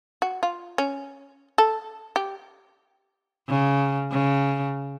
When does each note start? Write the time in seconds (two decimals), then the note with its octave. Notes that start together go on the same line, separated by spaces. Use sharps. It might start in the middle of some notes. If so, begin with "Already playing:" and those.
0.22 F#4
0.43 F4
0.78 C#4
1.58 A4
2.16 G4
3.49 C#3
4.12 C#3